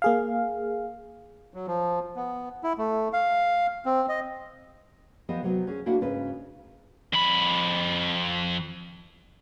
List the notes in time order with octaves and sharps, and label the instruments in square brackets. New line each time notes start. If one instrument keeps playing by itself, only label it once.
[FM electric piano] A#3 G#4 F5
[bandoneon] F#3
F3
B3
E4
A3
F5
C4
D#5
[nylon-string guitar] F3 B3 G4 D#5
C3 F#3 B3
C#4 G#4
A#3 D4 E4 F#4 A4 F#5
G#2 C#3 C#4 B4
[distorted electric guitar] F2 B5